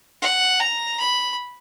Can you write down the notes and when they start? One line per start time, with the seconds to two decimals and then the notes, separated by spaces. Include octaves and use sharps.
0.22 F#5
0.60 A#5
0.99 B5